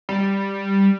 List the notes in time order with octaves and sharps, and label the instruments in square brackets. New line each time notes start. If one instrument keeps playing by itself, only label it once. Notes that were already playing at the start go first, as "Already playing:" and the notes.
[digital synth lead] G3